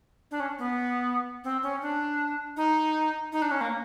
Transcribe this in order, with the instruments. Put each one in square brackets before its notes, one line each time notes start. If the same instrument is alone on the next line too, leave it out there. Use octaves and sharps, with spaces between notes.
[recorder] D4
C#4
B3
C4
C#4
D4
D#4
D#4
D4
C#4
A#3